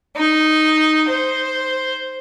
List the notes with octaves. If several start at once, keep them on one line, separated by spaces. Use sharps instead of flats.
D#4
C5